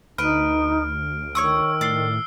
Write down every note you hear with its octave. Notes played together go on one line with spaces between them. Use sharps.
D2 D#4 B4 F6 D7
D#3 C#5 C#6 D#6 E6
A2 D5 E6 C7 G7